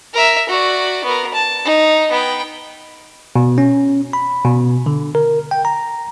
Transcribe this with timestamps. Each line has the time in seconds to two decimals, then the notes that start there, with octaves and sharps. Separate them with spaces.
0.15 A#4 E5
0.50 F#4 D5
1.05 B3 A#4
1.34 A5
1.65 D#4
2.12 B3 G5
3.36 B2
3.58 C#4
4.13 B5
4.45 B2
4.86 D3
5.15 A#4
5.51 G5
5.65 A#5